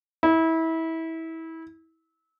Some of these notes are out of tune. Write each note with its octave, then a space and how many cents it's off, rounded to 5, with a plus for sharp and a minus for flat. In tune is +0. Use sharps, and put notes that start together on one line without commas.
E4 -25